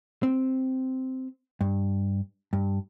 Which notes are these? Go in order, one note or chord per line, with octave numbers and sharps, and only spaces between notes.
C4
G2
G2